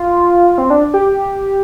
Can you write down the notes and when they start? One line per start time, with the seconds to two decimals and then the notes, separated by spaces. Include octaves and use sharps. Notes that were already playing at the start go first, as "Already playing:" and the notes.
Already playing: F4
0.58 C4
0.70 D4
0.94 G4